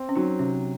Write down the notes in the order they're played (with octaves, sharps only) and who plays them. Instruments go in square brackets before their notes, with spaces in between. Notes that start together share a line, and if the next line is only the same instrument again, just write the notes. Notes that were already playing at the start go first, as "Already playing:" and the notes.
Already playing: [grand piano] C4
[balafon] C#4
[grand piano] F#3 [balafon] D#4
[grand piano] C3 [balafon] C#4